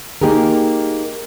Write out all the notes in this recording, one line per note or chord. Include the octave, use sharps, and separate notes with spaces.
A#3 D#4 G4 G#4 A#4